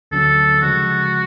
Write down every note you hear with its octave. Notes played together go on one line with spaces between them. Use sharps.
D2 D3 F#3 C#4 A4
C#3 F3 G#3 F#4